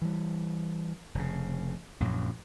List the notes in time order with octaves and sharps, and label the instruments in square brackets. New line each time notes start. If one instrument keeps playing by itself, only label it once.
[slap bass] E3 G3
F1 C#3
A#1 F#2 A#2 F#3